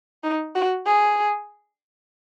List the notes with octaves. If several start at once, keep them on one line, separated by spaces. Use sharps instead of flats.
D#4
F#4
G#4